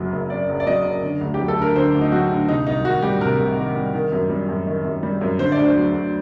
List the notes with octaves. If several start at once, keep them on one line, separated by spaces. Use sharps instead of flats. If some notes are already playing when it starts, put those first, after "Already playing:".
Already playing: F#1 F#2 F#3
F#1
F#2 D5
F#1
D5
F#3 D#5
F#1
D3
D2
G4
F#3
A4
D2 A#4
D3 C5
D2
D#4
F#3 F#4
D2
C3 D#4
C2 D#4
D#3 F#4
G3 G4
C3 A#4
C2
D#3
G3
D#3
F#2
G3
F#2
D#3
F#2
G3
F#2
D3 C5
D5
D2
C5
F#3
D2